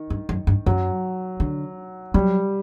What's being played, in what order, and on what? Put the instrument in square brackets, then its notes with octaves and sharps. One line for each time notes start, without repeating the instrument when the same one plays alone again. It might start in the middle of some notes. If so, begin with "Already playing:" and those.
Already playing: [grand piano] D#3
[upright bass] G2
F#2
G2
[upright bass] F#2 [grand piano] F#3
[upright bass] D3
[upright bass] F#3 [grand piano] G3